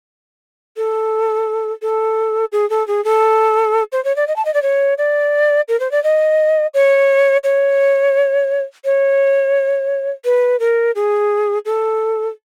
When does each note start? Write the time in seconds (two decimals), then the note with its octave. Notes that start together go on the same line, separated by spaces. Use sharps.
0.77 A4
1.82 A4
2.52 G#4
2.70 A4
2.87 G#4
3.04 A4
3.92 C5
4.04 C#5
4.16 D5
4.27 D#5
4.36 A5
4.45 D#5
4.54 D5
4.62 C#5
4.98 D5
5.68 A#4
5.80 C5
5.91 D5
6.03 D#5
6.74 C#5
7.44 C#5
8.85 C#5
10.25 B4
10.59 A#4
10.95 G#4
11.65 A4